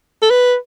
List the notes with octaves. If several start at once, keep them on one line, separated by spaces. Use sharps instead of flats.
A4
B4